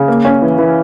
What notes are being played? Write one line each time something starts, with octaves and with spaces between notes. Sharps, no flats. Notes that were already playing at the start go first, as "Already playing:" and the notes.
Already playing: C#3
A#3
C#4
E3
E3